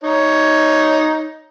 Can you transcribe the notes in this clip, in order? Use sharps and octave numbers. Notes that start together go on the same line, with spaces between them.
D#4 C#5